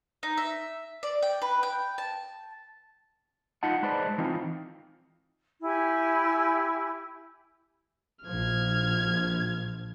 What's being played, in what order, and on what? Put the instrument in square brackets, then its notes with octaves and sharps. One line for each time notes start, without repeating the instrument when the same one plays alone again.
[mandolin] D#4
E5
D5
G5
B4
G5
A5
[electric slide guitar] D#4 F4 D#5 F#5 A5
G#3 B4 C5 D5 D#5 A5
E3 C4 D#4 F4
[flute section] E4 G4 G#5
[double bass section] A#1 F3 [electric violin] F6 G#6